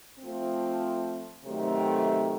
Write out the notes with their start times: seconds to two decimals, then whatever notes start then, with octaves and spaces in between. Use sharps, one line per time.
0.19 F3 A3 C4
1.43 C3 D#3 F#3 A3